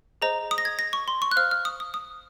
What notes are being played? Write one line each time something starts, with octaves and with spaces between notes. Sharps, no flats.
G#4 C5 D#5 A#5
D#6
A#6
G#6
A#6
C#6
C6
C#6
F#6
C5 F5 F6
F6
D#6
D#6
D#6